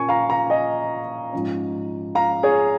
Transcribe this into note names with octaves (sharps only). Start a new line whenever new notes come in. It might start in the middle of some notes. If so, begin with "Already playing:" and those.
Already playing: A#2 A#3 C#4 G#5 C#6
F5 A#5
F5 A#5
D#5 G#5
G#2 F3 C#4
F5 A#5
G#4 C#5